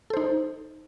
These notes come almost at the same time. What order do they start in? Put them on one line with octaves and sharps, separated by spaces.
A4 C5 D#4